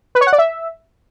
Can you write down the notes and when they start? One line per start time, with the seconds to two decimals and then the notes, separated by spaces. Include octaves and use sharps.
0.15 B4
0.21 C#5
0.27 F#5
0.33 D5
0.38 E5